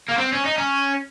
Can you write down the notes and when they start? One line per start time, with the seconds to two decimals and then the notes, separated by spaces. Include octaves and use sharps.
0.08 A#3
0.18 C4
0.32 C#4
0.45 D#4
0.58 C#4